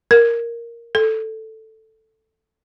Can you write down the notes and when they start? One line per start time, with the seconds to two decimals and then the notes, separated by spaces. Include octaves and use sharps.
0.11 A#4
0.95 A4